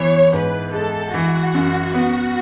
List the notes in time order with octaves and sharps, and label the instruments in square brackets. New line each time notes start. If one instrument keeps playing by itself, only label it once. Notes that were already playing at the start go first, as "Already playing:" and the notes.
Already playing: [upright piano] E3 B3 [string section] C#5
[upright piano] G#2 [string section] B4
[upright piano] G#3 [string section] A4
[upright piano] E3 [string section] F#4
[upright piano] F#2
B3